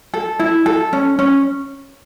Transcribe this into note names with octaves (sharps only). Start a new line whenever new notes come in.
A4
E4
A4
C#4
C#4